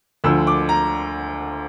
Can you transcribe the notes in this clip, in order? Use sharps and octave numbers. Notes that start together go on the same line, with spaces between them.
D2 D3 F3 E6
D6
A#5